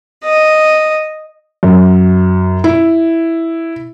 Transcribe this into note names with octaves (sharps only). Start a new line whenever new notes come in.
D#5
F#2
E4